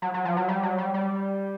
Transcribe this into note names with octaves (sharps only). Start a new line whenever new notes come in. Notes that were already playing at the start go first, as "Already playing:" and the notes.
F#3
F#3
F3
F#3
G3
F#3
G3
G3